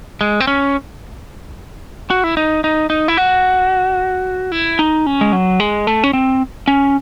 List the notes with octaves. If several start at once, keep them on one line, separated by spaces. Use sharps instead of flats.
G#3
C4
C#4
F#4
E4
D#4
D#4
D#4
E4
F#4
E4
D#4
C#4
G#3
F#3
G#3
A3
C#4
C4
C#4